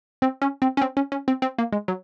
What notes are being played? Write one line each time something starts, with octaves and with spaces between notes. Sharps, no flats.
C4
C#4
C4
C#4
C4
C#4
C#4
C4
C4
A#3
G#3
F#3